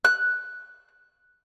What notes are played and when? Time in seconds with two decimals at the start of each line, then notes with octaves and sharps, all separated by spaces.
0.05 F#6